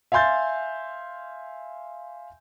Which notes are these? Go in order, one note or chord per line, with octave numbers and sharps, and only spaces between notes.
E5 F5 G#5 C6 G6 A6